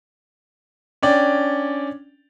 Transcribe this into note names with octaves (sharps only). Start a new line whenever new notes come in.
C#4 D4 D5 G5